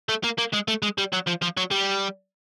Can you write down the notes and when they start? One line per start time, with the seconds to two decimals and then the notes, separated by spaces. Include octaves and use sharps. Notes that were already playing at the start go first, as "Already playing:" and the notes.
0.09 A3
0.24 A#3
0.38 A#3
0.53 G#3
0.68 A3
0.82 G#3
0.98 G3
1.13 F#3
1.27 F3
1.42 F3
1.57 F#3
1.71 G3